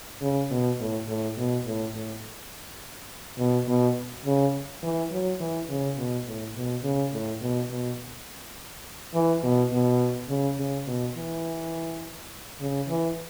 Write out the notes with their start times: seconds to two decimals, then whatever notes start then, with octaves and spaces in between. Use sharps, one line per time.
0.22 C#3
0.50 B2
0.80 A2
1.08 A2
1.37 B2
1.66 A2
1.95 A2
3.38 B2
3.68 B2
4.26 C#3
4.83 E3
5.11 F#3
5.40 E3
5.69 C#3
5.97 B2
6.27 A2
6.55 B2
6.83 C#3
7.13 A2
7.41 B2
7.70 B2
9.14 E3
9.43 B2
9.72 B2
10.29 C#3
10.59 C#3
10.87 B2
11.16 E3
12.60 C#3
12.89 E3